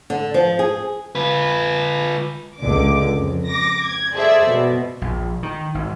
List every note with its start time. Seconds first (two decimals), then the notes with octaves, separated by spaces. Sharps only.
0.10 D3
0.34 F3
0.59 G#4
1.15 F4 B4
2.59 C#2 D3 D6
3.16 F2
3.46 D6 A#6
3.84 G#6
4.14 G#4 A4 C5 D5 E5
4.48 B2
5.02 A#1
5.43 D#3
5.75 G#1